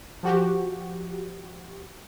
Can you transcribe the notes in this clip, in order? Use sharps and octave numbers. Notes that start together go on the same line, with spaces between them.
F3 F#4 G4